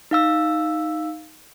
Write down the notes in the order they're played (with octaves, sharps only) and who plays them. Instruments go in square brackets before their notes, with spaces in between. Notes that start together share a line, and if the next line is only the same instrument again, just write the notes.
[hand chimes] D#4 F5 E6